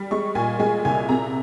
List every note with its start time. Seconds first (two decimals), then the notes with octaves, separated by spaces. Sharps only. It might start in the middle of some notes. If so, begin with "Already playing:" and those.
Already playing: G3
0.11 G#3 C#6
0.35 A#2 G#5
0.59 G#3 G#5
0.85 C2 G#5
1.09 C3 A#5